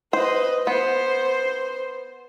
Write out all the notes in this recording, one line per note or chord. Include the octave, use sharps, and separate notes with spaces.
B4 C5 D#5
B3 C5